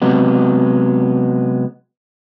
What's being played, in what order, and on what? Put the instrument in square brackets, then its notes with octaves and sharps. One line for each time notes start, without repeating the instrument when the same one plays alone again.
[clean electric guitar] C3 F#3 G#3 B3